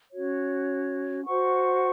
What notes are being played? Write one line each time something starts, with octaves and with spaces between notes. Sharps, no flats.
C#4 F#4 C#5
F#4 C5 F#5 C#6